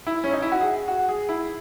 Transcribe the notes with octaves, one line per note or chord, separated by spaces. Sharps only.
E4
C#4
D#4
E4
F#4
G#4
F#4
G#4
E4